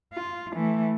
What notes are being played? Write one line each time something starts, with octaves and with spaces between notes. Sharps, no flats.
F4
E3 A3